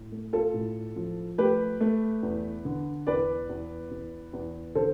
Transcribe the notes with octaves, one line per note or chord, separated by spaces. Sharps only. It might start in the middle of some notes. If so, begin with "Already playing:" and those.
Already playing: A2
A3
F4 A4
A2
F3
A3 G4 B4
A3
E2
D3
E2 B4 D5
E2
E2
E2
D3 A4 C5